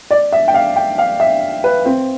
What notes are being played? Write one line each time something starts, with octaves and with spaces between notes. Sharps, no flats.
D5
E5
G5
F5
G5
F5
E5
B4
C4